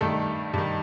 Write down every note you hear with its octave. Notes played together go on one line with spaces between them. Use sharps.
G2 D#3 A3 A4
G2 D#3